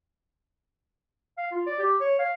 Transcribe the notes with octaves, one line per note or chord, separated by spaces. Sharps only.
F5
F4
D5
G4
C#5
F5